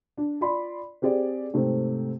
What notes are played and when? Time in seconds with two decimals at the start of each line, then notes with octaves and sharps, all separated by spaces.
0.17 D4
0.41 F4 D5 B5 C6
1.02 C4 G4 G#4 D5
1.53 G#2 C3 A3 C4